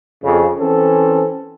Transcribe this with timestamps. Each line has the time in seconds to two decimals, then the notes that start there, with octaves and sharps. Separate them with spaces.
0.23 F2 C#3
0.58 E3 C4 C#4 A4